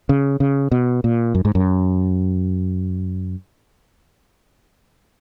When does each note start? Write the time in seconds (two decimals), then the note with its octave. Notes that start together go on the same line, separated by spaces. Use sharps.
0.09 C#3
0.40 C#3
0.71 B2
1.04 A#2
1.35 F#2
1.45 G#2
1.55 F#2